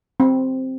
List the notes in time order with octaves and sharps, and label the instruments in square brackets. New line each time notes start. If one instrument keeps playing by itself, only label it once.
[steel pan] C4